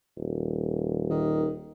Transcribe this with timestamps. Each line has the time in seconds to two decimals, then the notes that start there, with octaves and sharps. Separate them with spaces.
0.17 D#1
1.10 D#3